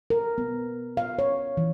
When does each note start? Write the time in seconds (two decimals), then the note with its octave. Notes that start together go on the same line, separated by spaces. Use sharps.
0.10 A#4
0.38 B3
0.97 F5
1.19 C#5
1.57 E3